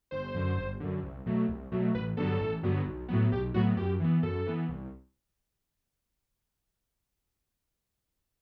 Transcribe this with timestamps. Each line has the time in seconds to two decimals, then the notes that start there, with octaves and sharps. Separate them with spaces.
0.11 G1 C5
0.35 F#2 D3
0.57 G1
0.80 F#2 D3
1.03 C2
1.26 B2 F#3 A3
1.48 C2
1.72 B2 F#3 A3
1.94 A1 B4
2.17 G2 D3 F#3 B3 A4
2.40 A1
2.63 G2 D3 F#3 B3
2.86 B1
3.08 A2 F#3 B3
3.32 B1 G4
3.54 A2 F#3 B3 F#4
3.77 F#2 G4
4.00 E3 B3
4.23 F#2 A4
4.46 E3 B3
4.69 C2